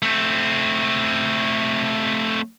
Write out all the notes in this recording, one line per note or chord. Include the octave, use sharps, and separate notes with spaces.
A3 C4